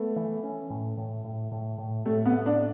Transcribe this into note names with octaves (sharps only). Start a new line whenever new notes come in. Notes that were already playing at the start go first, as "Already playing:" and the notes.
Already playing: A3 B3
E3
C#4
A2
A2
A2
A2
A2
A2 A3
B3
A2
D4